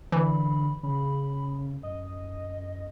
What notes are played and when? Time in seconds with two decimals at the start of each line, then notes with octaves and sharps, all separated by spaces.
0.12 D3 E3 B5
0.83 C#3 B5
1.83 F#2 D#5